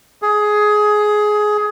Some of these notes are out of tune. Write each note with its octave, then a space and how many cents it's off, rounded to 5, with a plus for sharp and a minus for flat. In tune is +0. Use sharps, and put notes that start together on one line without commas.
G#4 +15